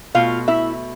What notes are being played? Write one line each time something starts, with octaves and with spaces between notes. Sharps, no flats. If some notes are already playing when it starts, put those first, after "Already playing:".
B2 A3 F4 F5
E4 E5